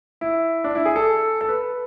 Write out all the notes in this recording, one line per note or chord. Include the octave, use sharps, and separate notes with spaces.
E4
D4
E4
G#4
A4
A4
B4